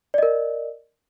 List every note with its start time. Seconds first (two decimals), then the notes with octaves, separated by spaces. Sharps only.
0.14 D5
0.18 D#5
0.23 A#4